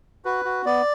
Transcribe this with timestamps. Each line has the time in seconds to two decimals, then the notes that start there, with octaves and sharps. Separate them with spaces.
0.25 F#4 B4
0.45 F#4
0.65 B3 D5